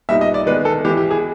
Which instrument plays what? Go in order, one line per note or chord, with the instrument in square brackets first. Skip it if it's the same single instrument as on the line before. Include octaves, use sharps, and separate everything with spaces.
[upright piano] A#2 G3 B3 D#4 [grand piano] E5
[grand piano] D#5
D5
[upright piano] D#3 G#3 B3 [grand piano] B4
[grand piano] A4
[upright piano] E3 G#3 B3 [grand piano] G4
[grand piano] G4
G#4